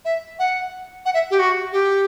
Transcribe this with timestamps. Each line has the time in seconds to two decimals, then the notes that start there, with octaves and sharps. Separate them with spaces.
0.05 E5
0.39 F#5
1.06 F#5
1.14 E5
1.31 G4
1.39 F#4
1.73 G4